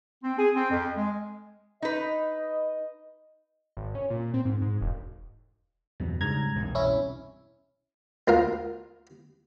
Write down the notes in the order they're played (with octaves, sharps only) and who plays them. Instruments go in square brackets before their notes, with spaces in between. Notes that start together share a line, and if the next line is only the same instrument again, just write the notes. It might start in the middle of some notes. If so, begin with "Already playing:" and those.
[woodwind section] C4
G#4
C4
F2
G#3
[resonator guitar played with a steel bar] D#4 B4 [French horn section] D#5
[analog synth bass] G#1
C#4
A#2
C4
G#2
G#2
E1
[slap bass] E2 G2 [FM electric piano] B2
[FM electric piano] G#2 A#5 G#6 [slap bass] C#3 G3
[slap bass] E1 C2 G2
[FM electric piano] C#4 E4
[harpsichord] D2 A#2 F4 A#4